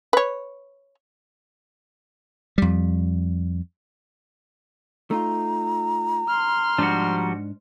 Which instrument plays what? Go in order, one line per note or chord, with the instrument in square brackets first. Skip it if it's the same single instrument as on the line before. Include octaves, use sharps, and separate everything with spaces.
[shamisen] B4 C#5
[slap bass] F2 G3
[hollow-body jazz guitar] A3 D#4 F4 [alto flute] A#5
[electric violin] C6 F6
[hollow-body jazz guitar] G#2 D4 [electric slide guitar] F3 G3 F#4